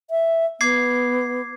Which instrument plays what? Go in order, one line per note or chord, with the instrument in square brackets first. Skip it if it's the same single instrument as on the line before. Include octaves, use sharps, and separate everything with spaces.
[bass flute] E5
[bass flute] B3 [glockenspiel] D6 G#6 C7